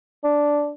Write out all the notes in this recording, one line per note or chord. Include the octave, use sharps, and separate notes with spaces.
D4